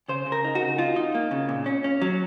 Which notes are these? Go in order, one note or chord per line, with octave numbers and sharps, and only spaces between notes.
C#3 C5
C#3
A#4
D#4
F#4
C#3
D#4 F4
D#4
A#3
C#3
A#2
C#4
C#4
F#3